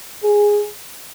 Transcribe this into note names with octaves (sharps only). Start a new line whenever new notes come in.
G#4